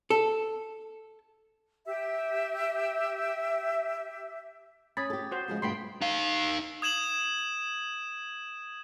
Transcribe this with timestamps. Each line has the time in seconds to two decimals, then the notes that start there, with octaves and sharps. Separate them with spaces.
0.10 A4
1.86 G4 E5
4.97 C#4 B5 D#6 G#6 A6
5.10 G4 A4
5.32 F#4 C5
5.48 C#3 F3 G#3
5.62 D2 G2 B2 G5 B5 C6
6.02 D#4 F5
6.82 D#6 G#6 E7 F#7